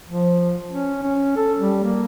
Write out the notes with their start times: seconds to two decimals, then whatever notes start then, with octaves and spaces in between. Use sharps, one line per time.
0.09 F3
0.71 C#4
1.02 C#4
1.36 A4
1.58 G3
1.83 A#3